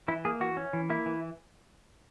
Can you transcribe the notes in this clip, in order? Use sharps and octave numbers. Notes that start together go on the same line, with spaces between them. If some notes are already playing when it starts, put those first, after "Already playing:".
E3 E4
A#3 G#4
E3 F#4
C#4
E3
A#3 E4
E3